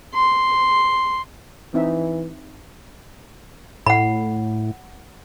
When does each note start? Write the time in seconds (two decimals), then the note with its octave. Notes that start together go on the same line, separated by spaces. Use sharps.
0.14 C6
1.74 E3 C4 D#4 E5
3.86 A2 F#5 B5